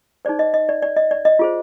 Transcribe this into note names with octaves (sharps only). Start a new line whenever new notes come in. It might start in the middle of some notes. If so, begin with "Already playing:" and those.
D#4 G#4 C5 D5
D#5
D#5
D5
D5
D#5
D5
D#5
F4 G#4 C5